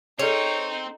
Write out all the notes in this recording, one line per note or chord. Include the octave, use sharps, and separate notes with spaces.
C4 D#4 G#4 A4 C#5